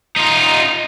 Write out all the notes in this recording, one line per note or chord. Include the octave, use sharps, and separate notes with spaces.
D#4 F4